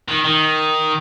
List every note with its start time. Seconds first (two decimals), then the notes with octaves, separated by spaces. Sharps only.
0.08 D#3
0.25 D#3